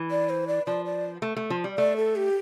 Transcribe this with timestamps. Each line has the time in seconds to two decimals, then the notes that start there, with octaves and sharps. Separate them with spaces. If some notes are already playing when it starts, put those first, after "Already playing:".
Already playing: E3
0.11 D5
0.30 C5
0.47 D5
0.66 F3 D5
0.85 D5
1.22 A3
1.37 A3
1.50 F3
1.64 G3
1.78 A3 D5
1.97 A4
2.16 G4